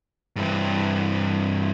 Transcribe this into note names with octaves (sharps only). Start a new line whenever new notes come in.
G2 E3